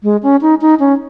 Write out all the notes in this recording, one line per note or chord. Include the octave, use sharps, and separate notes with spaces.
G#3
C#4
D#4
D#4
C#4